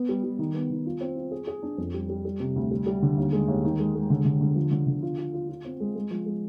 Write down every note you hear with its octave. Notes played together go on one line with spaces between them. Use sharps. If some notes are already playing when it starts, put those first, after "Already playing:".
Already playing: B3
G3
G3
D#3
B3
D#3
F4
C4
F4
G#4
G#4
D4
F2
G3
G3
G3
C3
D2
G3
G3
D3
D#2
G#3
D#2
D#3
G#3
G#3
D3
D3
D3
F3
D3
D3
F4
F4
F4
F4
C4
G#3
G#3
F3
G#3